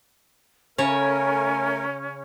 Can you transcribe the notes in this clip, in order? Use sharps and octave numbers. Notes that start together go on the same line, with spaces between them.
C#3 A3 C#4 A#4 C#5 G#5